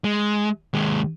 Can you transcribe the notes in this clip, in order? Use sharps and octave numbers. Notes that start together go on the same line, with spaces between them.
G#3
D#2 G#3